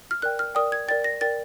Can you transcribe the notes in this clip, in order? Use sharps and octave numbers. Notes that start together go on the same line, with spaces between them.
F6
A#4 D5 G5 F#6
F6
A#4 D5 G5 D#6
G#6
A#4 D5 G5 A6
A#6
A#4 D5 G5 A6